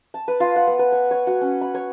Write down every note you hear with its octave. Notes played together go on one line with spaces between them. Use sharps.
A5
B4
F4
F#5
B3
B4
C#5
C#5
F#4
C#4
B5
C#5